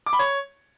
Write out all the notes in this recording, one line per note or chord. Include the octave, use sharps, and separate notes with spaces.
D6
B5
C#5